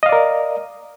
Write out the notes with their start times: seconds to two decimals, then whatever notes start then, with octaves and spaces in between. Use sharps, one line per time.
0.03 D#5
0.06 F5
0.09 D5
0.12 A#4